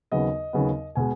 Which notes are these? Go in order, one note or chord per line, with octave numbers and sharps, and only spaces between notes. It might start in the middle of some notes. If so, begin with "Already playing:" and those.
D#2 C#3 F#3 B3 D#5
D#2 C#3 F#3 B3
B2 G#3 G#5